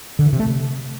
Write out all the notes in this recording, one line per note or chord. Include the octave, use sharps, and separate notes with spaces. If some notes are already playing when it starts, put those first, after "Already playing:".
D3
E3
C3
A3
C3